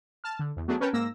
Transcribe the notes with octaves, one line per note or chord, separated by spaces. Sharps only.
A5 F6
D3
E2
F#3 A3 B3 D4 G#4
C#4 A#4 B4 C#5 G5 A5
G#2 A#3 E6 A#6